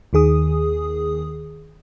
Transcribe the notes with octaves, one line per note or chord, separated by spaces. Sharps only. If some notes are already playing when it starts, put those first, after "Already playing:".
D#2 D#3 G#4 D#6